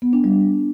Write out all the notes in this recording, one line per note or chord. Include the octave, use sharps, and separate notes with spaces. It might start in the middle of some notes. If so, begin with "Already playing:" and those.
B3
D4
G3